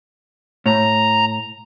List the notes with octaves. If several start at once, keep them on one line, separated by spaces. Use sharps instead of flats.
A2 A#5